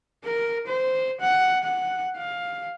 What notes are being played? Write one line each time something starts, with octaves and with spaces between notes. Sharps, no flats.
A#4
C5
F#5
F#5
F5